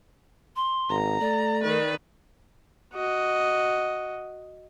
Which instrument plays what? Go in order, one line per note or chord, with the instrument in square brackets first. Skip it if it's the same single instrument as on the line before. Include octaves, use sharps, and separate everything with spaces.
[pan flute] C6
[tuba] G#1 [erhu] A#5
[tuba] A3 [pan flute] D5
[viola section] D#3 [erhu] B4
[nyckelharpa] F#4 D#5